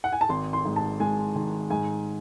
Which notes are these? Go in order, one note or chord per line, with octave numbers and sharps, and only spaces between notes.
F#5
G#5
A5
G#1 C6
C6
G#2
A5
G#3 G#5
D#3
G#2 G#5